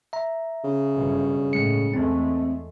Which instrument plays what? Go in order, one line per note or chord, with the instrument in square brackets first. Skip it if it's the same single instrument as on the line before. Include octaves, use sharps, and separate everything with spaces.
[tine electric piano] E5 A#5
[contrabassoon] C#3
[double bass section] G1 F#2 B2
[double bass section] A2 [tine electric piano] G#3 C#7
[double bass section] E2 G#3 A3 [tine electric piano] C4